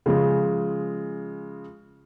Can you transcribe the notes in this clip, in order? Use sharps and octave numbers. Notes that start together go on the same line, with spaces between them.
C#3 F3 G#3